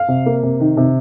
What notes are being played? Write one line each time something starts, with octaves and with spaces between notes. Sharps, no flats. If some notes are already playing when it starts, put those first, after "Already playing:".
Already playing: F5
C3
A#3
C3
D#3
C3